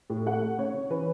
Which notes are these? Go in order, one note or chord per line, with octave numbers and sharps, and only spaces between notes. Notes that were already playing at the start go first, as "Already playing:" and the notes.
A2
A3 F#5
A3
C#3 C#5
C#3
E3 B4